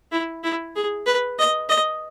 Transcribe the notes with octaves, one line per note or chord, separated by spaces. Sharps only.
E4
E4
G#4
B4
D#5
D#5